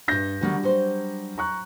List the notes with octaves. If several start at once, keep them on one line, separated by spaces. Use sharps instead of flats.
E2 G2 D4 G6 A#6
D3 D#3 F#3 G3 D4
F#3 C5
A#5 C#6 F#6